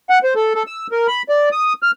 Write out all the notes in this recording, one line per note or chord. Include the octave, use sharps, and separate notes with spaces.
F#5
C5
A4
A4
E6
A#4
B5
D5
D#6
F6